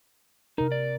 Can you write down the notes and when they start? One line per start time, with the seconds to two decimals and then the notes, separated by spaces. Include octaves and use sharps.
0.58 C3 D#4 A#4
0.72 D5